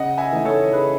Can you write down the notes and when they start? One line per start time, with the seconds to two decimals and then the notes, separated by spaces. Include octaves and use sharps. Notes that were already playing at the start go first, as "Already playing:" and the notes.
Already playing: C#3 D#5 F#5
0.18 E5 G#5
0.31 E3 A3 D#4
0.45 A4 C#5
0.72 C#3 G#4 B4